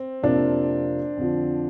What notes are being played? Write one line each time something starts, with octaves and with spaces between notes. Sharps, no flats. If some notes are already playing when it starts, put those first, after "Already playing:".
Already playing: C4
F2 C3 A#3 D4 F4
F2 D3 F3